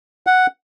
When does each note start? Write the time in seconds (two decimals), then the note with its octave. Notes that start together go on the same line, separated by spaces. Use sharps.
0.27 F#5